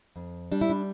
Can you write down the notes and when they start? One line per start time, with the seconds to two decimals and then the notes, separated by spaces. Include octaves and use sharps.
0.16 F2
0.52 G3 D4
0.61 E4
0.70 D4